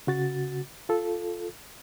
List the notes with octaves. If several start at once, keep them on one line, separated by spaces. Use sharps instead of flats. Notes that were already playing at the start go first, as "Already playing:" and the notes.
C#3 F#4 A6
F4 A4